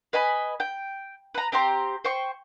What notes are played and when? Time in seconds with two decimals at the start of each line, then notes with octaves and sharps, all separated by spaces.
0.13 B4 D#5 G#5 B5
0.60 G5
1.34 B4 A#5
1.52 C4 G4 A#5 C6
2.04 C5 G5 C#6